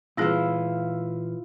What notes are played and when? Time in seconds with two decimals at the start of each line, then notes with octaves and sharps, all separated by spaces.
0.17 A#2 E3 G3 C4 E4 F4 G#4 B4